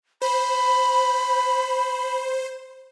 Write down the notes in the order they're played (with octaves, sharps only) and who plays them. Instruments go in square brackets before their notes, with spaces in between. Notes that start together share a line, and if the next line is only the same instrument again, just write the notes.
[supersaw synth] C5 [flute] B5